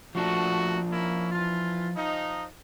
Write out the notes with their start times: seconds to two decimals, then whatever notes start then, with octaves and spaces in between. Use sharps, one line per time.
0.15 F3 A3 D4 F#4
0.91 A#3 C#4 E4
1.32 E3 F4
1.95 F3 D#4